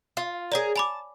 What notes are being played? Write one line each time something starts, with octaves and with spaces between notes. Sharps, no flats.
F4
G#4 A#4 C#5 D5
G#5 A5 B5 D6